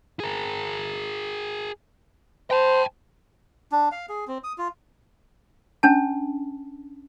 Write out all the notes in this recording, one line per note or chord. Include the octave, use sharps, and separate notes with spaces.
G#4 A#4
C5 G5 A5
D4
F5
G#4
C4
D#6
F4
C#4 D4 A5